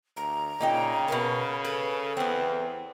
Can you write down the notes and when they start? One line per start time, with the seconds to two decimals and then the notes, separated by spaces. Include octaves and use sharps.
0.17 D2 A#5
0.61 A#2 C#3 D#4 G5
1.08 B2 A#4 A5
1.65 A4 B4
2.17 E2 B3 C4